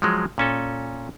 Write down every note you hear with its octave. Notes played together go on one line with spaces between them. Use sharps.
F3 F#3 G#3
A#2 C#4 A4